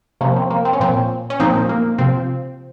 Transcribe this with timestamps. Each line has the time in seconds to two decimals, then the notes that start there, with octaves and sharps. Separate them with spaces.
0.21 C3 F3 A#3 C#4
0.36 C4
0.50 A#3
0.65 C4
0.73 C#4
0.80 A#2 F3 C4
1.30 C#4
1.40 A#2 F3 C4 D#4
1.69 A#3
1.98 C3 F3 C4